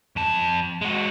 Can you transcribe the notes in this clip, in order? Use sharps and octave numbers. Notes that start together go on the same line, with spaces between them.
F2 A5
G#3 F#4